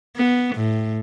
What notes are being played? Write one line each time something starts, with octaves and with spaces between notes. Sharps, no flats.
B3
A2